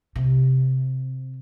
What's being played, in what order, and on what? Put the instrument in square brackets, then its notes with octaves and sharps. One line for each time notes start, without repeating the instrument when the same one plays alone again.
[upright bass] C3